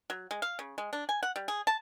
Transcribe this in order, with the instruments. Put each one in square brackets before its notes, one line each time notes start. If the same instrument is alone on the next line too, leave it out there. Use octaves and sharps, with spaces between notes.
[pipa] F#3
G#3
F5
C#3
G#3
D4
G#5
F#5
G3
G#4
A5